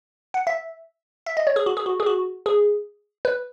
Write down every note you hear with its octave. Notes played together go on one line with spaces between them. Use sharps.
F#5
E5
E5
D#5
C#5
G#4
F#4
G#4
F#4
G#4
F#4
G#4
B4